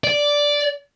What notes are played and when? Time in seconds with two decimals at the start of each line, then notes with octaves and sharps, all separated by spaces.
0.04 D5